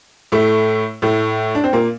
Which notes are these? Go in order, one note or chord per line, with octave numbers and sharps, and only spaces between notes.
A2 A3
A2 A3
D4
C4
A#2 A#3